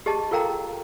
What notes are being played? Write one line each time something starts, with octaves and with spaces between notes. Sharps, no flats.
G4 G#4 D#5 A5
F4 A4 A#4 F5 G5 A#5